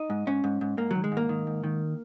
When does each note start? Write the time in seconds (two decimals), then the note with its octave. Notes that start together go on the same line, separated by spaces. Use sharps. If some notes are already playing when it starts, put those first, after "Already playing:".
Already playing: D#4
0.10 G#2
0.27 G#2 C#4
0.44 G#2
0.61 G#2
0.78 G#2 A#3
0.91 D#3 F#3
1.04 G#3
1.12 G#2
1.17 A#3
1.29 D#3
1.47 G#2
1.64 D#3